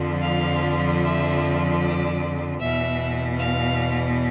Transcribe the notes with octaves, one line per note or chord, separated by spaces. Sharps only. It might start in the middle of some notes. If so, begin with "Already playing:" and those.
Already playing: F2 D3 F3
F5
E5
D5
E2 B2 E5
F5